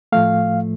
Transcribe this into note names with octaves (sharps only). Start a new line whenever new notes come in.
A2 F3 A3 F5